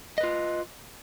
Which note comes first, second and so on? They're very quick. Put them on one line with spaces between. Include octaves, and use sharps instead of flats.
D#5 B4 F4